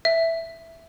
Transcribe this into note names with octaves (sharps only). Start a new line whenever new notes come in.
E5